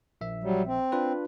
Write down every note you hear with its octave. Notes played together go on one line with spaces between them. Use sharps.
A#1 E5
F#3 G3
C4
D4 F4 B4